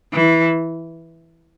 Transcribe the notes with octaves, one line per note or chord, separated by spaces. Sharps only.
E3